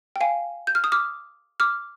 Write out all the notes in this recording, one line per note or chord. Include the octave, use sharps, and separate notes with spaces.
G5
F5 G#5
G6
F6
D#6
D6 F6
D6 F6